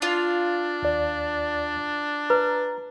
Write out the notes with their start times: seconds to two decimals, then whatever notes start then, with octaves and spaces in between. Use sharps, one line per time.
0.02 D4 F4
0.82 D#2 D5
2.30 B4 A#5